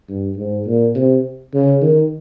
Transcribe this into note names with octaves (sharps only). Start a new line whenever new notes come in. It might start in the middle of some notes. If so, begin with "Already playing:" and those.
G2
G#2
A#2
C3
C#3
D#3